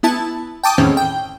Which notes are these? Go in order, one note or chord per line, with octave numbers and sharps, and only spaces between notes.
B3 E4 A5
G5 A5 D6 D#6
E2 A2 D#3 C4 C#4
G5